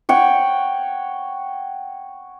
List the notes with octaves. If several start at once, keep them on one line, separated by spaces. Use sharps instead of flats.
C#5 F#5 G5